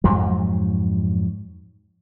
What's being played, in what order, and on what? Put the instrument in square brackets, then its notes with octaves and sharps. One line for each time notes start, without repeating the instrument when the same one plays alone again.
[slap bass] F2 G#2 F#3